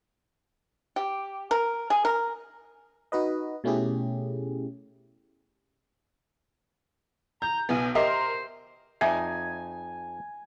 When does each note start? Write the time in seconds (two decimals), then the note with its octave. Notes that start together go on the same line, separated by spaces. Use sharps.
0.96 G4
1.51 A#4
1.90 G#4
2.05 A#4
3.12 D#4 F#4 B4 D#5
3.64 B2 A3 C#4 E4 G4 G#4
7.42 A#5 G6
7.69 B1 B3 G#5
7.95 G4 A#4 C5 D#5 E5 C6
9.01 F2 D#4 D5 E5 G#5